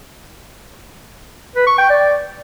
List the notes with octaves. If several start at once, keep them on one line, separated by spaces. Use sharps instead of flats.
B4
C#6
G5
D5